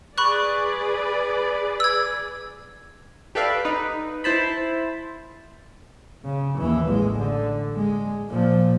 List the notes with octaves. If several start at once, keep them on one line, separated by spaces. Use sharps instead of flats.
G#4 B4 D5 B5 C#6 F#6
E6 G#6
G4 A4 B4 D5 E5 F5
D#4 B4
E4 C5 A5 B5
C#3
D#2 E3
A1 G#3
D3
G#3
A#2 F3